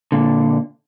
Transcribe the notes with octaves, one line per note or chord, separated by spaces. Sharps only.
A#2 D3